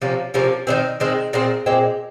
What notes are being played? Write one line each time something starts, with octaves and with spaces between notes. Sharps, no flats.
C3 F3 A#3 C#4
C3 F3 A#3 C#4
D#3 G#3 C4
D#3 G#3 C4
A#2 G#3 C4
A#2 G#3 C4